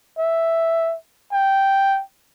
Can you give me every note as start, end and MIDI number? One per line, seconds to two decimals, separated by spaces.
0.18 0.95 76
1.32 2.02 79